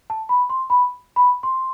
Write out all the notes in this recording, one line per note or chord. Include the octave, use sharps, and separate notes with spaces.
A5
B5
C6
B5
B5
C6